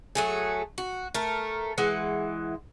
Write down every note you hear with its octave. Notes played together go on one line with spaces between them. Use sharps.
F#3 A3 G#4
F#4
A3 A#4
E3 G#3 F#5